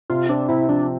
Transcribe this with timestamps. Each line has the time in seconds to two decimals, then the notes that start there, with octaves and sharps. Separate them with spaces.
0.10 C3 F4
0.29 C4 D4
0.49 C3 E4
0.69 F3 D4